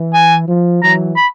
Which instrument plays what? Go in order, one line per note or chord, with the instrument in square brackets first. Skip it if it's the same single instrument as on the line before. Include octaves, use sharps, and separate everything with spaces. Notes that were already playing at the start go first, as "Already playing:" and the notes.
Already playing: [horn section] E3
[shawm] G#5
[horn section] F3
[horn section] E3 F#3 [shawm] A#5
[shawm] B5